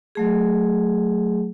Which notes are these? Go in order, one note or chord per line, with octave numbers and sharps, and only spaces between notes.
F#3 A3 G#4